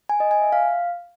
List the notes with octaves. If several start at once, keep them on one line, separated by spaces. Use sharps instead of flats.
G#5
D#5
G#5
E5
F5